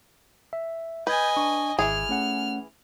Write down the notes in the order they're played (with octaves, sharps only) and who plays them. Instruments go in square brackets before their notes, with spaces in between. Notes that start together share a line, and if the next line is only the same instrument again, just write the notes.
[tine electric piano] E5
[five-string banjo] B4 [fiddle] D#5 G#5 [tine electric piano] G6 G#6
[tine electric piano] D4 C#6
[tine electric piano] G#1 [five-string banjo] E3 G#3 G#4 [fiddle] F6
[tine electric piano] A3 C#4 F#5